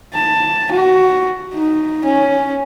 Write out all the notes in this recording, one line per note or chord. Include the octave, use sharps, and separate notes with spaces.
A5
F#4
D#4
C#4